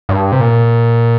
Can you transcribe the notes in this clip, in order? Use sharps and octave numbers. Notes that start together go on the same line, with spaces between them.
G2
C3
A#2